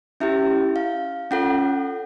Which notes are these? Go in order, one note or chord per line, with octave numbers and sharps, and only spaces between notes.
C#4 E4 G4 E5
F5
C#4 F4 A4 F#5